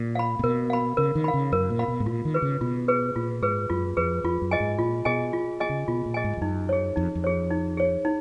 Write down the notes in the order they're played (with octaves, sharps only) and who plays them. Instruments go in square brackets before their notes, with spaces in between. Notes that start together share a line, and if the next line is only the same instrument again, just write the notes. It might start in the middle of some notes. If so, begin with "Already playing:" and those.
Already playing: [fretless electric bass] A#2
[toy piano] F5 B5
[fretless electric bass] A#2
[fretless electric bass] B2 [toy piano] A#4
[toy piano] F5 B5
[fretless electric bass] C#3 [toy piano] A#4
[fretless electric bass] D#3
[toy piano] F5 B5
[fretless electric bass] C#3
[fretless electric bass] F#2 [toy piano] A#4
[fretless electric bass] A#2
[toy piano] F5 B5
[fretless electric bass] B2
G#2
[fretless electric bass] A#2 [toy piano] F4
[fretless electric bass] D#3
[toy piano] G#4 B4
[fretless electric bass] C#3
[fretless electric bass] B2 [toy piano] F4
[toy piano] G#4 B4
[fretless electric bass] A#2 [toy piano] F4
[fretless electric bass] G#2 [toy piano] G#4 B4
[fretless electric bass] F#2 [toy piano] F4
[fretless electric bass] F2 [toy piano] G#4 B4
[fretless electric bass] F2 [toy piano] F4
[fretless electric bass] F#2
[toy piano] G#4 D#5 G#5
[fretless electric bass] G#2
[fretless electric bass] A#2 [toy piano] F4
[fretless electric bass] B2 [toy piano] G#4 D#5 G#5
[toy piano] F4
G#4 D#5 G#5
[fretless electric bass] C#3
[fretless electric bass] B2 [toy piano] F4
[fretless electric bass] A#2
[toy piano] G#4 D#5 G#5
[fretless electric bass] G#2
F2
[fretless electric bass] F#2 [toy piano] D#4
[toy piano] G#4 C#5
[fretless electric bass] F2 [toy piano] D#4
[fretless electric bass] F2
[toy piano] G#4 C#5
D#4
G#4 C#5
D#4